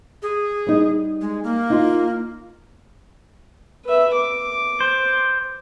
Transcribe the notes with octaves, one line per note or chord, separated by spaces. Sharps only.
G#4
G3 D#4
G#3
A#3
D#4 F4
B4 E5
D6
C5